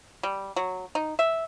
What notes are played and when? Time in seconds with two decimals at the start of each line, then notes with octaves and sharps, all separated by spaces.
0.23 G3
0.56 F#3
0.95 D#4
1.19 E5